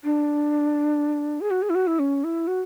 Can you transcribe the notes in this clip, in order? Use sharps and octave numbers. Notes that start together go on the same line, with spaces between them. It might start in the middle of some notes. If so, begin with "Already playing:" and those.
D4
G#4
F#4
G#4
E4
F#4
E4
C#4
E4
F#4